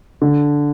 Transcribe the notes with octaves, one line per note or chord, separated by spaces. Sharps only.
D3